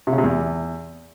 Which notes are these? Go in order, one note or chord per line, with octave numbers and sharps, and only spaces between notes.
C3
C#3
C3
E2